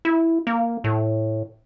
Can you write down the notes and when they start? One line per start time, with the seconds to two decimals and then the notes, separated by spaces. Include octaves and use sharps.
0.05 E4
0.47 A#3
0.84 A2